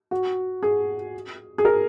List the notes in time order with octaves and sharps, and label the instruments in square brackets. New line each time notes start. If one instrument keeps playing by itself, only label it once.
[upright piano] F#4
G#4
G#4
A#4